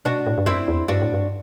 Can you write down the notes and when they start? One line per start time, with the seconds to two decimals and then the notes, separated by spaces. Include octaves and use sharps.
0.05 B2 D4 F#4
0.27 A2
0.38 G2
0.46 F#2 C4 E4
0.68 E2
0.88 G2 D4 F#4
1.02 A2
1.14 G2